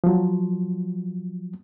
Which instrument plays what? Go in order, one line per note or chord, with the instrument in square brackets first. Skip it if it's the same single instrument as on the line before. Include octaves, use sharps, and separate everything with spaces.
[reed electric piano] F3 F#3